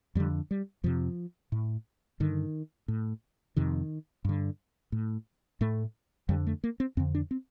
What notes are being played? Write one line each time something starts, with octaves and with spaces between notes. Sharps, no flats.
F2 D3 G3
G3
F2 C3 F3
A2
G2 D3 D#3
A2
F2 C3 D#3
G2 D3
A2
A2 A3
F2 D3 G3
A3
A#3
C4
F2 D3 C4
D4
C4